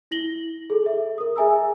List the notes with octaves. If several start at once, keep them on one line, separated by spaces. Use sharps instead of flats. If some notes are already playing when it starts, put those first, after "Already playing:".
E4 A#6 F#7 G7
G#4 A4
E5
A#4 D#6
G#4 E5 G#5 A#5 E6